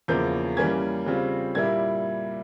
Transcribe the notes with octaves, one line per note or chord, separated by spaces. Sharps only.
E2 C#3 F3 A#3 G6
E3 G3 A#3 C#4 G#6
C#3 G3 C4 F4
A#2 G3 A#3 E4 G#6